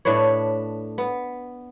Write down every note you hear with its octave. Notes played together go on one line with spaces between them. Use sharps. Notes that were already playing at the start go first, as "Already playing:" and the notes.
A2 D4 B4 C#5
B3